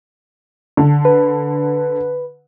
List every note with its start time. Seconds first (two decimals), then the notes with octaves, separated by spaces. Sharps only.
0.77 D3
1.05 B4